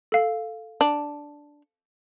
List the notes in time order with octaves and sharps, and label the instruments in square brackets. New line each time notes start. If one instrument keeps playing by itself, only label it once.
[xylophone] A4 F5
[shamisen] D4